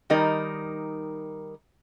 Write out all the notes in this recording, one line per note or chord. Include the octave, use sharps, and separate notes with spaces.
D#3 G3 D#4 A#4